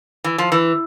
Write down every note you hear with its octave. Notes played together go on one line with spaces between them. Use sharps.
E3
F3
E3